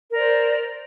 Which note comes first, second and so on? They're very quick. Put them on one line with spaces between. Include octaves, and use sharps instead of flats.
A#4 D5 C5